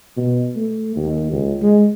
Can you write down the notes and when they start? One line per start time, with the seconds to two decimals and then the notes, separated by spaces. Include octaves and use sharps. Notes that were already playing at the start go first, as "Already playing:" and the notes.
0.17 B2
0.56 A3
0.96 D#2
1.31 C#2
1.62 G#3